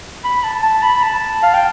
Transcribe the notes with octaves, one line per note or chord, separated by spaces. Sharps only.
B5
A5
A5
B5
A5
F5
G5